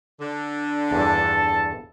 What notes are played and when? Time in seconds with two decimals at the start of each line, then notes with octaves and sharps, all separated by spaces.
0.20 D3
0.91 E2 G2 A4 A5